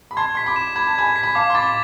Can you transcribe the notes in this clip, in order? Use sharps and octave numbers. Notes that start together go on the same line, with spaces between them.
B5
A5 C6 G#6
C6 B6
B5 D6
E7
B5 G#6
A5
G#5 B5 G#6
B6
B5
F5 A5 D6
C6
B5 D6 A6